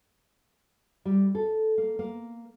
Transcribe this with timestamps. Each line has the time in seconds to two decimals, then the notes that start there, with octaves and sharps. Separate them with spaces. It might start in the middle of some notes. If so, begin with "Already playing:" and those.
1.05 G3
1.35 A4
1.78 A#3
1.99 A#3